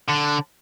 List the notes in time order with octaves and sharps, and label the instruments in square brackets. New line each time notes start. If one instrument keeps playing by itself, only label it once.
[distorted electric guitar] D3